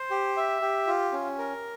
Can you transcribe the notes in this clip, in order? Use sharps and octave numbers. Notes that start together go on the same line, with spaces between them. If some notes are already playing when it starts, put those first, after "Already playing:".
Already playing: C5
G4
E5
G4
F4
C#4
A#4